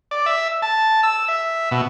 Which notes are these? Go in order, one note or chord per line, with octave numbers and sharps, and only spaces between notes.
D5
E5
A5
E6
E5
B2